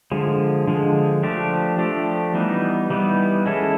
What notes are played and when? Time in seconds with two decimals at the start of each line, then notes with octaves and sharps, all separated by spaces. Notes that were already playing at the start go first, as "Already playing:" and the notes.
0.11 D3 F3 G#3
0.68 D3 F3 G#3
1.23 F3 A3 D4 G4
1.79 F3 A3 D4 G4
2.35 E3 G3 B3 D#4
2.90 E3 G3 B3 D#4
3.46 G#3 C#4 E4 A4